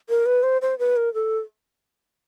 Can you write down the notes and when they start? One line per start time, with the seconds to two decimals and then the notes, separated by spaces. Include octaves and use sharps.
0.09 A#4
0.26 B4
0.43 C5
0.62 C5
0.79 B4
0.97 A#4
1.14 A4